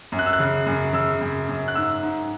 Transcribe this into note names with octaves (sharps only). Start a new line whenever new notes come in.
F#2
F#6
E6
F#6
C#3
F#2
C#3 E6
F#2
F#2
F#6
G#2 E6
G#2